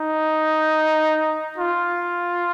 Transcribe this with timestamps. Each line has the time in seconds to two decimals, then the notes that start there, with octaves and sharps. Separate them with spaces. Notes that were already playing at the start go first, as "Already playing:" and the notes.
Already playing: D#4
1.58 F4